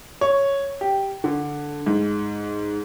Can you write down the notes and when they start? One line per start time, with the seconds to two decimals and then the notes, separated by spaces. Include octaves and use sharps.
0.21 C#5
0.81 G4
1.24 D3
1.86 G#2